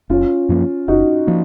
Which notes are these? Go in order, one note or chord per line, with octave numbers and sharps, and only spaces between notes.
F#1 C#4 F4
F#2 F3 A#3
F#1 D#4 F#4
F3 A#3